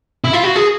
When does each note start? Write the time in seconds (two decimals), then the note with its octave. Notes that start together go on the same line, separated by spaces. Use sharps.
0.24 E4
0.33 F4
0.43 F#4
0.56 G#4